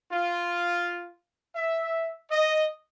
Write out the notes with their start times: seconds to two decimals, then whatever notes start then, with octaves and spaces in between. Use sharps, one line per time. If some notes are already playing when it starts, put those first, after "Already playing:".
0.12 F4
1.56 E5
2.31 D#5